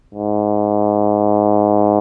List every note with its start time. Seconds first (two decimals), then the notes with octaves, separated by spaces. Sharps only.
0.14 G#2